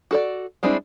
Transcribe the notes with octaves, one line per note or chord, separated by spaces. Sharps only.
F#4 A4 D5
G3 G#3 C4 D4 E4